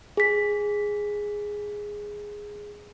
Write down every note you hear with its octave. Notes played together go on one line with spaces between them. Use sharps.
G#4 B6